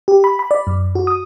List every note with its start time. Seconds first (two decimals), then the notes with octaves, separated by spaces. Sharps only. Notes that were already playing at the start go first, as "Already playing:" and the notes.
0.08 G4
0.24 B5
0.39 B5
0.51 D5
0.67 F#2
0.95 F#4
1.07 D#6